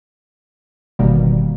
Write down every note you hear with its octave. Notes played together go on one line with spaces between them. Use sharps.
G1 B2 D#3 G3 A#3